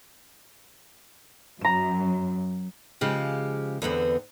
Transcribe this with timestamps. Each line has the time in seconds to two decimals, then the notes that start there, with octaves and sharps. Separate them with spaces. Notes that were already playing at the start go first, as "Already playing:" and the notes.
1.61 F#2 A#5 E7
3.01 C#3 F3 G#3 G4
3.82 E2 D3 B3 C4